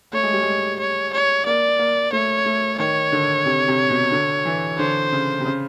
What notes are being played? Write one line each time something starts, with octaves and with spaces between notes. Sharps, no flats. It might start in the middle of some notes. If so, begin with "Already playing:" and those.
A3 C#5
G#3
G3
G#3
C#5
C#5
A#3 D5
A#3
A3 C#5
A3
D#3 C#5
D3
C3
C3
B2
D3
E3
D3 C5
C#3
C3
C#3